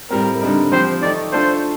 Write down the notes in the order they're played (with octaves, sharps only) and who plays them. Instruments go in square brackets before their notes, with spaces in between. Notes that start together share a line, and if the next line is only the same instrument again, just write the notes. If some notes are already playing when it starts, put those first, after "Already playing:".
[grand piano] A2 G3 C4 [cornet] A#4
[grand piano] D3 G3 C4 D#4 A#4
[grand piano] F3 C4 G4 [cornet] C5
[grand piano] D#3 A3 D#4 [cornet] D5
[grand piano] A3 D4 F4 A4 [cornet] C5